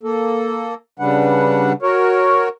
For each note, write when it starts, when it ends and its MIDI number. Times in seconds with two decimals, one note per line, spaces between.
0.03 0.74 58
0.03 0.74 69
0.99 1.73 49
0.99 1.73 55
0.99 1.73 62
0.99 1.73 71
0.99 1.73 78
1.82 2.49 66
1.82 2.49 70
1.82 2.49 73